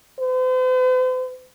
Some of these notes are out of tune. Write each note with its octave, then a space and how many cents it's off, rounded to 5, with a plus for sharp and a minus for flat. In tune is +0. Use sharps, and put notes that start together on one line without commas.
C5 -45